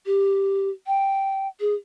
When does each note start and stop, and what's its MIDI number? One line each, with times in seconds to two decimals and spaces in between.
0.06 0.70 67
0.87 1.48 79
1.60 1.74 68